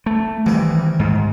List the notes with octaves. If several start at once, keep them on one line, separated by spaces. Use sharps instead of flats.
A3
C2 D#3 E3
G#2